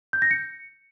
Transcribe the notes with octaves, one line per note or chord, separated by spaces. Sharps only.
G6
A#6
C#7